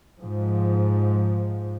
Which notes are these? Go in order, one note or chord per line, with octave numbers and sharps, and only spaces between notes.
G#2 F3